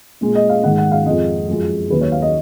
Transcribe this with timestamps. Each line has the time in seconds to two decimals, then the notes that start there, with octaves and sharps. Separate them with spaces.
0.21 A#2 G#3
0.35 D#5
0.49 F5
0.63 G#2 D#3 G#3 F#5
0.78 F#5
0.92 F5
1.06 F2 F3 G#3 D#5
1.48 F#2 F3 G#3
1.90 D#2 D#3 F#3 B4
2.01 C#5
2.12 F5
2.22 D#5